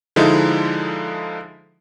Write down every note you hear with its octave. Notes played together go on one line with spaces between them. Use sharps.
D3 F3 G#3 D#4 E4